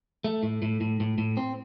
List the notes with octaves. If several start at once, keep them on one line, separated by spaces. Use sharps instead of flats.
A3
A2
A2
A2
A2
A2
C4